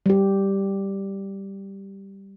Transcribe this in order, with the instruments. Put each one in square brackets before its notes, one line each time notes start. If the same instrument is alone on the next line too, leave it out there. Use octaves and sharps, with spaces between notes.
[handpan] G3 G4